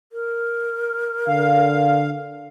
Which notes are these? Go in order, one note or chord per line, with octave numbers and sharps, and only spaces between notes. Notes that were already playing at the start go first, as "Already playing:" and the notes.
A#4
D3 F5